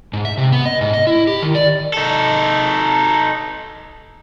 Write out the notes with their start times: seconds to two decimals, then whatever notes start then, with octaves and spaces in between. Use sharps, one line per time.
0.13 G#2
0.25 E5
0.37 C3
0.52 B3
0.66 D#5
0.81 G#2
0.94 D#5
1.07 E4
1.27 G4
1.42 D#3
1.55 D5
1.94 D#4 A4